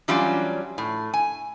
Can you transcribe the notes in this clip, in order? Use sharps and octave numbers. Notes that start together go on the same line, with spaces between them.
E3 F#3 G3 C#4 D4 F4
A2
G#5